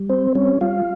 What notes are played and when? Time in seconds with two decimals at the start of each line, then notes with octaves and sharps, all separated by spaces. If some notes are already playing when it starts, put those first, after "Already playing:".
Already playing: G3
0.10 C4 C5
0.35 G3 C#4 C#5
0.61 G3 F4 F5